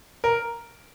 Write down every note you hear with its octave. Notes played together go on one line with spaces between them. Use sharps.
A#4